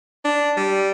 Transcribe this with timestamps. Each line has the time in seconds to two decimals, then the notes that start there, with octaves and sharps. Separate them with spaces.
0.25 D4
0.57 G3